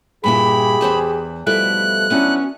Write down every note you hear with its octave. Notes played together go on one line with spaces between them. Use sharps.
G2 A#2 E4 G4 G#4 B5
E2 C5 A5
B2 F3 G3 A3 E4 A4 F#6
F#3 B3 C#4 D4 E4 F#4